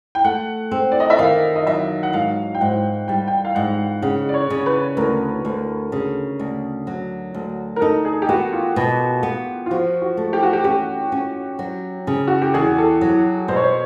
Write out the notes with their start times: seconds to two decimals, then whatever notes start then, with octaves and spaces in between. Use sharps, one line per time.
0.15 G5
0.24 A3 F#5
0.71 C4
0.92 D5
1.00 D#5
1.10 E5
1.19 D#3 F5
1.56 D#5
1.67 F#3 E5
2.03 F#5
2.13 G#2 F5
2.55 G5
2.61 G#2 F#5
3.08 G3 G5
3.28 G5
3.45 F5
3.55 G#2 F#5
4.02 C#3 F#5
4.29 D5
4.34 C#5
4.50 C#3
4.66 B4
4.97 D2 A#4
5.45 D2
5.92 C#3
6.40 D2
6.87 F#3
7.34 D2
7.76 A#4
7.81 D#4 A4
8.05 G#4
8.22 G4
8.29 B3 F#4
8.53 F4
8.76 B2
9.23 B3
9.66 F4
9.70 F3 F#4
10.02 F#4
10.17 A3
10.33 G4
10.43 F#4
10.53 G4
10.64 C#4 G4
11.12 C#4
11.59 F#3
12.07 C#3
12.27 F#4
12.42 G4
12.54 E2 G#4
12.78 A4
13.01 F#3
13.48 B2 C5
13.56 C#5
13.64 C5